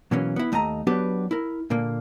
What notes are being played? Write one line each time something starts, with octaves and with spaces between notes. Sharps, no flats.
B2 E3 F#3 A#3 C#4
B3 E4
D#2 A3 D#5 F5 A#5
F#3 B3 D4 G4 B4
E4 A#4
A#2 D3 A#3